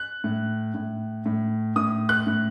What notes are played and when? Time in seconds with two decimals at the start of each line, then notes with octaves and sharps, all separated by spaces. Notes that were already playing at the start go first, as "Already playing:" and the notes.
Already playing: F#6
0.24 A2
0.75 A2
1.26 A2
1.76 A2 D#6
2.09 F#6
2.27 A2